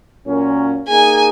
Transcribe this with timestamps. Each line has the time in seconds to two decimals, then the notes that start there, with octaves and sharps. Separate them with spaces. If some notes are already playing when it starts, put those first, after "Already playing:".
0.26 A#2 F#3 C#4 F4 A#4
0.88 A#3 D#4 G#4 G#5